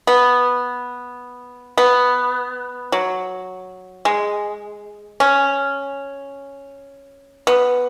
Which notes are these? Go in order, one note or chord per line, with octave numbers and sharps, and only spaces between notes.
B3
B3
F#3
G#3
C#4
B3